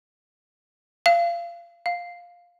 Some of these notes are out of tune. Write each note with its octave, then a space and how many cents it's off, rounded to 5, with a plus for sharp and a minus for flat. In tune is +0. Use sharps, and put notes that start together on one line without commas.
F5 -25
F5 +10